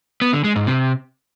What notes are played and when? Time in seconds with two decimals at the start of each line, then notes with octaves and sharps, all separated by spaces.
0.22 B3
0.33 D3
0.44 G#3
0.56 G#2
0.67 C3